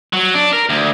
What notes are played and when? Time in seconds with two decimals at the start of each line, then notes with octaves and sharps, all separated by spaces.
0.13 F#3
0.34 D4
0.53 A#4
0.69 D2